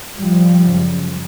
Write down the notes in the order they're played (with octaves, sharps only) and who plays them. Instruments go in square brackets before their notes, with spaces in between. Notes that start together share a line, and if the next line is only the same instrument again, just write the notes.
[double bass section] F3 G3
F#2 C#3